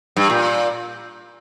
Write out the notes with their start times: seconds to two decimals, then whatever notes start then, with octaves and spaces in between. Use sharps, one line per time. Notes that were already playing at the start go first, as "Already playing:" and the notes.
0.16 G2
0.30 A#2